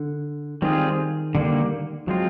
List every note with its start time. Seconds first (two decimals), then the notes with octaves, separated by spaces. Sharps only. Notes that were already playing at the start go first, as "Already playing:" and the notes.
Already playing: D3
0.62 D#3 G3 C4 F4 G#4
1.35 D3 G3 A#3
2.07 F3 F#3 G#3 C4 F4